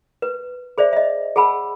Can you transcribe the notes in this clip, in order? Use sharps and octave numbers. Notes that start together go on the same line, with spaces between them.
B4
G#4 C5 D5 E5
D#5 E5
G#4 F#5 A5 B5 E6